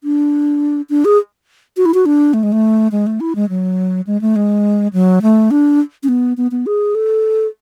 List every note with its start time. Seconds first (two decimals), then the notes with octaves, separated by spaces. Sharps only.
0.04 D4
0.90 D4
1.05 G#4
1.77 F#4
1.86 E4
1.94 F#4
2.06 D4
2.34 A3
2.43 G#3
2.52 A3
2.92 G#3
3.07 A3
3.20 E4
3.36 G#3
3.49 F#3
4.07 G#3
4.21 A3
4.36 G#3
4.93 F#3
5.22 A3
5.51 D4
6.03 C#4
6.09 B3
6.37 B3
6.51 B3
6.66 G#4
6.95 A4